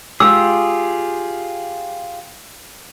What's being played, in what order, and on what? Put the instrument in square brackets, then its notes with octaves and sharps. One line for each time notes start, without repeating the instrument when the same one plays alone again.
[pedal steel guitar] F4 G4 G#4 [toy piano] E6